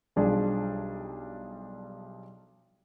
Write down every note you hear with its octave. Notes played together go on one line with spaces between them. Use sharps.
B1 F3 G3 D4 G#4 D5